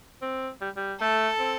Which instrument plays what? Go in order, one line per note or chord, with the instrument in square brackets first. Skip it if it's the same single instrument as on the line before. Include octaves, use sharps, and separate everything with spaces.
[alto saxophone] C4
G3
G3
[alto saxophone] A3 [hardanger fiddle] A4
[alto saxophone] C4